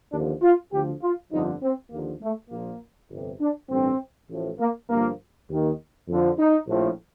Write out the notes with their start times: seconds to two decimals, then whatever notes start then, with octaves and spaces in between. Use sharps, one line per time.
0.12 D#2 D3 F3 D4
0.42 F4
0.71 D2 D3 F3 G4
1.01 F4
1.31 G1 F2 D3 F3 D#4
1.61 C4
1.91 D#2 D3 F3 A#3
2.21 A3
2.50 A#1 A#2 F3 A#3
3.10 G1 F2 C3
3.40 D4
3.69 A1 G2 D3 C4
4.28 A1 A2 F3
4.59 A#3
4.88 G1 G2 F3 A#3
5.49 D#2 D#3
6.08 F2 D3 F3
6.38 D#4
6.67 A#1 A2 F3